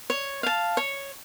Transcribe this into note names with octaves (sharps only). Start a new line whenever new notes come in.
C#5
F5 A5
C#5